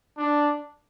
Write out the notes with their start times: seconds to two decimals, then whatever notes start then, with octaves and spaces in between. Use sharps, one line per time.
0.18 D4